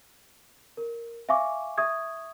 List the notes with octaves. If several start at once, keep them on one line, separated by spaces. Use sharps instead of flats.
A#4
E5 F5 G#5 C#6 D6
E5 C#6 D#6 G#6